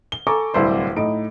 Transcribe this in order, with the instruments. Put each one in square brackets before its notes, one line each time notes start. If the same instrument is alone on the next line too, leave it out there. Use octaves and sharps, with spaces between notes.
[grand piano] G7
A4 G#5 A#5 C#6 D6
D1 C2 E4 C5 C6
A2 D#4 D7